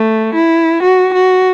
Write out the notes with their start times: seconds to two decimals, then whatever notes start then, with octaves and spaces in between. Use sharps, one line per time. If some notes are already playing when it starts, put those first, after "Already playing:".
Already playing: A3
0.35 E4
0.82 F#4
1.14 F#4